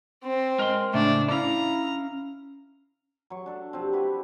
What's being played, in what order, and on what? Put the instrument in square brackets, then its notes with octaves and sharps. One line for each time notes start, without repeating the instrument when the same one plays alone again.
[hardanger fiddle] C4
[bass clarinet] G#3 [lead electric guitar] A#4 C6
[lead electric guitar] A2 C#3 [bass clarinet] A3 [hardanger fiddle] D4
[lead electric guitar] C#4 F5 [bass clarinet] E4 [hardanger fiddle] A#5
[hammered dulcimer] F#3 C#6
D4 A4
C3 F3 C4
E4 F#4 G4 B4